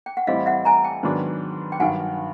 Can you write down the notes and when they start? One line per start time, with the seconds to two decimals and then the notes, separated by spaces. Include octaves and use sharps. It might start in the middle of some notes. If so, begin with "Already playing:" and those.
0.06 G5
0.17 F#5
0.27 A2 E3 G3 C4 E4 D#5 F5
0.46 E5 F#5
0.65 G#5 A#5
0.84 G5 A5
1.03 G#2 D#3 F#3 B3 D4
1.72 G5
1.80 G2 D#3 F#3 F#5 G#5